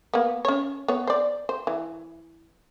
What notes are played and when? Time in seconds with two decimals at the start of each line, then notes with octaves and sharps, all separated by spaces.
0.14 A#3 B3
0.45 C#4 C#5
0.88 B3 C#5
1.07 C5 D5
1.49 C5
1.67 E3